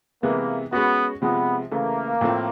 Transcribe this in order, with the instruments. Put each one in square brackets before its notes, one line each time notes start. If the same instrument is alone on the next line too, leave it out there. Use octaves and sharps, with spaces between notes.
[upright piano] C3 E3 G#3 B3 [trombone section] A#3
[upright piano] G#3 C#4 F#4 [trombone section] B3
[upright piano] C3 F3 G#3 [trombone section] B3
[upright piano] C#3 E3 A3 [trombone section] A#3
[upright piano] A2 F3 A3 C4